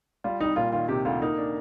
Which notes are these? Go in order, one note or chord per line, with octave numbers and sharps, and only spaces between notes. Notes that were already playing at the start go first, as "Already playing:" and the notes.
G3 F4
C2 D#4
A#2 F4
D#3 F4
C3 G4
D2 F4
A#3 D#4
D4